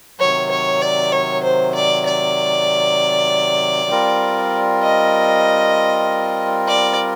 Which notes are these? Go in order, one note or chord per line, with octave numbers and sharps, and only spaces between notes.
C3 D#3 F#3 C#5
C#5
D5
C#5
C5
D5
D5
G3 C4 F4 A#4
D#5
D5